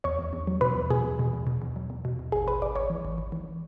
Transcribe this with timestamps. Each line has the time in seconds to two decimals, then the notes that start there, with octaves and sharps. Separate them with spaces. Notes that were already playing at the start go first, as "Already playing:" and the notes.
0.04 E2 C#5 C#6
0.19 E2
0.33 E2
0.47 F#3
0.61 B2 B4 B5
0.75 E2
0.90 B2 G#4 G#5
1.04 E2
1.19 B2
1.33 E2
1.47 B2
1.62 E2
1.76 F#3
1.90 E2
2.05 B2
2.19 E2
2.32 G#1 G#4 G#5
2.47 G#1 B4 B5
2.62 G#1 D5 D6
2.76 G#1 C#5 C#6
2.90 E3
3.05 G#1
3.18 G#1
3.32 E3